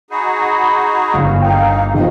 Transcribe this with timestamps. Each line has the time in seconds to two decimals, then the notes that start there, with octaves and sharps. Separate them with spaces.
0.11 D#4 F#4 G#4 B5
1.14 G1 F5
1.42 A#3 D#4 G5
1.94 G#1 A2 D#3 F3 F#3 D#5